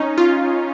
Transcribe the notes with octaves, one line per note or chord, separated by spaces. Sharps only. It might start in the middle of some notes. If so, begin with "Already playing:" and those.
Already playing: C#4 D#4
F4